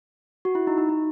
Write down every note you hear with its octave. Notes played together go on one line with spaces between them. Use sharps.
F#4
E4
D#4
D#4
D#4